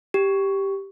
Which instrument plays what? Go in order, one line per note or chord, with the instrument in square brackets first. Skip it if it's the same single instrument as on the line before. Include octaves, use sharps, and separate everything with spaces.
[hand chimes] G4